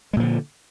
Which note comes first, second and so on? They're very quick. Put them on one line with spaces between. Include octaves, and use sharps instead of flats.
G#3 A#2 F3 D3